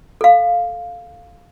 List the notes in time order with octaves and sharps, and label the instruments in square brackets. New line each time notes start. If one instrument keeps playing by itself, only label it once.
[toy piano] A4 F5